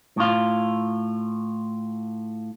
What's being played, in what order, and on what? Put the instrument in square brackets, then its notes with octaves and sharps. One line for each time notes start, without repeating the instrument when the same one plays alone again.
[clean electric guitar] A2 F4